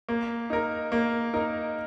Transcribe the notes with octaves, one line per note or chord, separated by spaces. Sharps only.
A#3
D#4 A#4
A#3
D#4 A#4